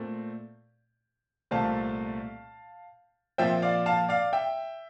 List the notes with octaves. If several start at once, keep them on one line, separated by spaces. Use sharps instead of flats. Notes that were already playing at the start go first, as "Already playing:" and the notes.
Already playing: A#2 A3 C4
C2 A#2 A3 C4 F5 A5
A#2 F3 C4 E5 G5
D5 F5
F5 A5
D5 F5
E5 G5